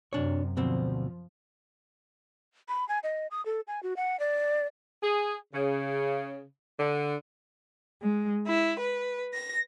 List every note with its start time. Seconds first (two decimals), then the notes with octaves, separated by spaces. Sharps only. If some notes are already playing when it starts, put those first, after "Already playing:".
0.13 F#2 C3 D4 C#5
0.57 D2 B2 F3 C4
2.68 B5
2.88 G#5
3.03 D#5
3.31 D#6
3.45 A4
3.67 G#5
3.83 F#4
3.96 F#5
4.19 D5
5.02 G#4
5.53 C#3
6.79 D3
8.02 G#3
8.46 E4
8.78 B4
9.33 A#6